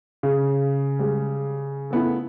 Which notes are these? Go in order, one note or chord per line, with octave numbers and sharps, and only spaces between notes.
C#3
G3 G#3
A3 B3 E4